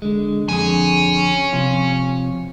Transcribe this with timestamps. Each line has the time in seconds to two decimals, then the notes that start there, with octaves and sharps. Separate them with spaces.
0.02 D3 G#3
0.49 F2 D3 G#4 C#5 G#5
1.53 C3 F3 F4